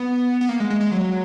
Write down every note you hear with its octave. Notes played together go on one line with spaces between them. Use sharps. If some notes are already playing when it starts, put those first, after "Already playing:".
Already playing: B3
B3
A#3
G#3
G#3
G#3
F#3